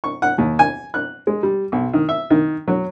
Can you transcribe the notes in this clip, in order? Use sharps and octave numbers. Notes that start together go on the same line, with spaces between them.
C#6
F#5
D#2
G#5
F#6
G#3
G3
B1
D#3
E5
D#3
F#3